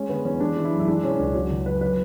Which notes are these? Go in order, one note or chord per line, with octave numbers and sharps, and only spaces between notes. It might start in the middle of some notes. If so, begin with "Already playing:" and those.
Already playing: G#3 C#4
D3 B3
E2 C#4
G#3 D4
E3
E4
F#2
E4
G#3 D4
B2 C#4
C#2 D4
F#3 F#4
C#3
F#2 B4
F#3 B4